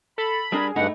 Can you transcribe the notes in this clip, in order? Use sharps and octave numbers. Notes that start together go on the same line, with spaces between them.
A4 B5
G3 D4 G#4 A#4
G2 A3 D#4 E4 F#5